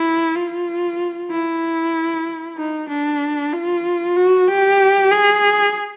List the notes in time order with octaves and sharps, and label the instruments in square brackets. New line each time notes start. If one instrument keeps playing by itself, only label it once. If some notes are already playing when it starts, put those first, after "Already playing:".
Already playing: [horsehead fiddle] E4
F4
E4
D#4
D4
F4
F#4
G4
G#4